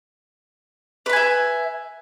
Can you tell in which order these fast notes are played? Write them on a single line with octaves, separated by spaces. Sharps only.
B4 B5 G#5 E5